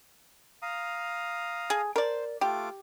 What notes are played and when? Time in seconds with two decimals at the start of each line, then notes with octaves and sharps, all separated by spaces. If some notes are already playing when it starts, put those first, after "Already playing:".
0.62 F5 A#5 D#6
1.70 G#4
1.96 A#4 C5 D5
2.41 A3 F4 G4 D6